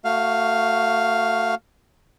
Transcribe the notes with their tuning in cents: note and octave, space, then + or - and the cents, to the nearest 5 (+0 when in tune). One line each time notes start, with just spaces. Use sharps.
A3 +25 F#4 +0 F5 +0